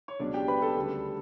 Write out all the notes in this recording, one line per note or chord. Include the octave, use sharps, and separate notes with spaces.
C#5
C#2 B2 F#3 D4 D5
G4 G5
B4 B5
A4 A5
D2 C#3 G3